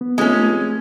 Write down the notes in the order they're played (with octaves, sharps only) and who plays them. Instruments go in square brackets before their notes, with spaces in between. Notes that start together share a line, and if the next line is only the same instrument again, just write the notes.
[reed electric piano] B3
[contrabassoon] F1 [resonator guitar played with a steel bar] G#3 C#4 [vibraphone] A3